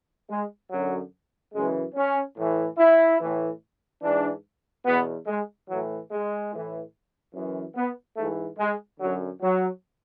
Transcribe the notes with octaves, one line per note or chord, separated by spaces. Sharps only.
G#3
F#2 D3 F#3
F#2 C#3 E3 G#3
C#4
A2 E3
E4
A2 E3
G#2 E3 D4
E2 B2 B3
G#3
A2 E3 F#3
G#3
A2 E3
F#2 E3
B3
G#2 E3 A3
G#3
F#2 D3 F#3
F#3